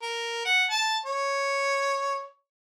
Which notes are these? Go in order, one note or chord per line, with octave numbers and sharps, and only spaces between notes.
A#4
F#5
A5
C#5